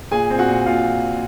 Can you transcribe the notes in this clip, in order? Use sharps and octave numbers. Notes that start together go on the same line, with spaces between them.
A#2 G#4 G#5
C4
F#4 F#5
A#2
A#2 F4 F5